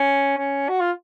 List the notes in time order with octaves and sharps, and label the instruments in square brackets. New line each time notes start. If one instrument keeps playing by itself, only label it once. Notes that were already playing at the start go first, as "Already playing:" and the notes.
Already playing: [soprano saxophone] C#4
C#4
F#4
F4